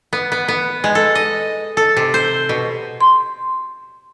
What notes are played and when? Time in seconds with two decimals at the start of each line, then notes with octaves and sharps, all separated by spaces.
0.13 B3
0.32 B3
0.48 B3
0.84 G#3
0.95 A4
1.15 D#5
1.77 A4
1.97 C3
2.14 C5
2.49 B2
3.01 C6